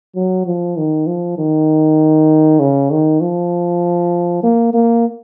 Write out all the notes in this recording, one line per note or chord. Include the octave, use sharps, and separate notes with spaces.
F#3
F3
D#3
F3
D#3
C#3
D#3
F3
A#3
A#3